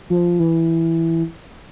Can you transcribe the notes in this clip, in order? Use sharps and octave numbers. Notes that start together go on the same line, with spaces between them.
F3
E3